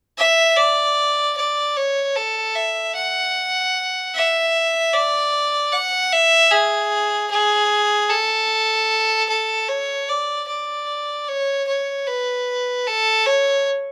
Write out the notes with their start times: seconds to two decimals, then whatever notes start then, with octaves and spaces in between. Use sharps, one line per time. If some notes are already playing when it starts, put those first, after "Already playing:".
0.18 E5
0.57 D5
1.37 D5
1.76 C#5
2.16 A4
2.55 E5
2.95 F#5
4.14 E5
4.93 D5
5.72 F#5
6.12 E5
6.51 G#4
7.30 G#4
8.10 A4
9.29 A4
9.69 C#5
10.09 D5
10.48 D5
11.28 C#5
11.67 C#5
12.07 B4
12.86 A4
13.26 C#5